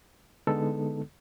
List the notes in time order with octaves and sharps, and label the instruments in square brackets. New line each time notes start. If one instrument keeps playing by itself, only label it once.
[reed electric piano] D3 G#3 B3 D#4 A4